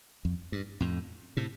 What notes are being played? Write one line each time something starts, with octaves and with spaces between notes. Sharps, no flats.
F2
G2
F2 A2
A2 C3